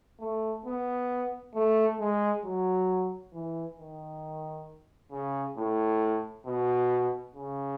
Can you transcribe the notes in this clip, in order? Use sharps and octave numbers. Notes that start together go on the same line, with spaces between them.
A3
B3
A3
G#3
F#3
E3
D#3
C#3
A2
B2
C#3